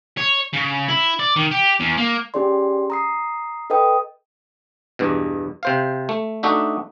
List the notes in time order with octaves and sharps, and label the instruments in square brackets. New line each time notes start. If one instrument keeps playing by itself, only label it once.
[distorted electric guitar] C#5
C#3
E4
D5
D#3
G4
E2
A#3
[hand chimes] C#4 G4 G#4 D5 C6
A#5 D#6 C7
A4 B4 D#5 G5 D#6
[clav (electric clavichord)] E2 G2 B2
C3 C5 F5
A3
A3 D4 D#4 F#4 E5